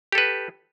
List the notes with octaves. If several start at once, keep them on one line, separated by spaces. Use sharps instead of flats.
G4 A4 B4